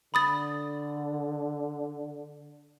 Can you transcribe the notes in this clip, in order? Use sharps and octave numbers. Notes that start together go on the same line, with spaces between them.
D3 B5 D#6 A6